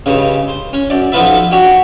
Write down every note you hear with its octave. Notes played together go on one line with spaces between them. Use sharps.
C#2 G2 C#3
C5
C#4
F#2 D5
B1 F3 B3 F4 B4 E5
D4 F#4 G4 G5